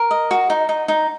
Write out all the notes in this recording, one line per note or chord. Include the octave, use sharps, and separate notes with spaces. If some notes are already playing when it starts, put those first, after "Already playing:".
Already playing: A#4
D#5
F#4
D#4
D#4
D#4